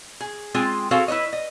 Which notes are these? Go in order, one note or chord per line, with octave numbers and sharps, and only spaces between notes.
G#4
G#3 C4 F4 G#4 G5
C4 F#4 G#4 A4 C5 F5
E4 B4 C#5 D#5
D#5